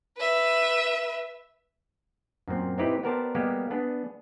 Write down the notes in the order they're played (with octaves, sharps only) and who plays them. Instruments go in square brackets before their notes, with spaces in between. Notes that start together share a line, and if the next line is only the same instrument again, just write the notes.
[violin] B4 E5
[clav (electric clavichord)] F#2 A#2 C4
C4 D#4 E4 G4 B4
B3 G4 A#4 C5 D5 A5
G3 G#3 A#3 B3 G4
B3 D4 G#4